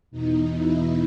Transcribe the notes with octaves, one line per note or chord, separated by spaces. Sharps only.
E2 B2 D#4
E4